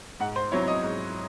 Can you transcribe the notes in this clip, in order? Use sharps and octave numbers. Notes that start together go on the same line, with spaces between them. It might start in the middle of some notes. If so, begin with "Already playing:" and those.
G#2 F#5
C5
F#3 C4 E4 C#5
D#5
G#2